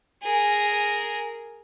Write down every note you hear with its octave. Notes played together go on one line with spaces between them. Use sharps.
G#4 A#4